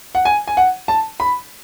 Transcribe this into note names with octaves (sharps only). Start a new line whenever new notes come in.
F#5
G#5
G#5
F#5
A5
B5